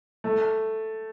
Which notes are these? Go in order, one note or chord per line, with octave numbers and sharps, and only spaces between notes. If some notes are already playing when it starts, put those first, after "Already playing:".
A3